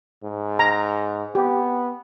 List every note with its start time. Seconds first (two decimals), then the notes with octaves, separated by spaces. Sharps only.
0.24 G#2
0.59 A#5
1.35 B3 G4